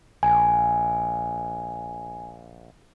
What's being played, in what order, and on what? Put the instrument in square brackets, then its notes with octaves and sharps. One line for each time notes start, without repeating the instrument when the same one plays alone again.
[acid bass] A#1 [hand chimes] G#5